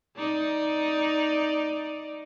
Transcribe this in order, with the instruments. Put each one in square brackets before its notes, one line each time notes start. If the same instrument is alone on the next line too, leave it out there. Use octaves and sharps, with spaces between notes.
[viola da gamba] D#4 D5